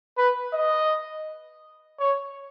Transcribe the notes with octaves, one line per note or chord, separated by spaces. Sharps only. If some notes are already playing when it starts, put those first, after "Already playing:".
B4
D#5
C#5